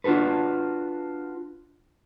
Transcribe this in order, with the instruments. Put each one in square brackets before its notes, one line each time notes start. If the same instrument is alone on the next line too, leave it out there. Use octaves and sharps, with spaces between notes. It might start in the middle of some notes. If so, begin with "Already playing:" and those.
[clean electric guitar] D4 F4 F#4 A4 B4